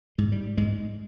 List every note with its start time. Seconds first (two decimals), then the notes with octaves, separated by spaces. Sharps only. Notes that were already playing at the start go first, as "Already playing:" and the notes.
0.18 G#2 G#3
0.32 G3
0.57 G#2 G#3